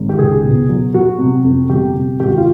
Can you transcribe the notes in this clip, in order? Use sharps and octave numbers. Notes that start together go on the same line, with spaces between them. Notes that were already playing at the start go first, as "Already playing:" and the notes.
Already playing: G#1
G4
C#2 G#4
B2
F#3
F#3 F#4
C3
F2
G1 G4
C3
G#1 G4
F#4
F4